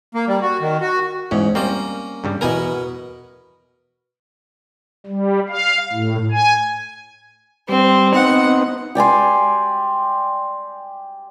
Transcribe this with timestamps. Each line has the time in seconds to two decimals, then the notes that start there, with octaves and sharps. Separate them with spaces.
0.15 A#3
0.28 G3
0.42 F#4
0.60 D#3
0.81 F#4
1.31 E2 G#2 C#4
1.55 G3 A#3 C4 C#4 A#5
2.24 G2 C#3 G3
2.41 E2 B2 B3 A#4 G#5 A#5
5.06 G3
5.49 F5
5.92 A2
6.31 G#5
7.69 G3 C4
8.14 B3 C4 D#4 F#5
8.95 G4 D5 G#5 C6